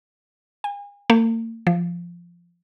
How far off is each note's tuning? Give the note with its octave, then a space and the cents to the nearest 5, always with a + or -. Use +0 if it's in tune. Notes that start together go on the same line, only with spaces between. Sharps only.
G#5 -40
A#3 -45
F3 -10